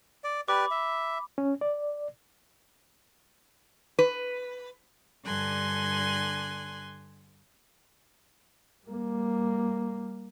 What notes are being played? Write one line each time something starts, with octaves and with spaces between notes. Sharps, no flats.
D5
G4 B4 D5 B5 D6
E5
C#4
D5
B4
G2 D3 G#5 C6 F#6
G3 A#3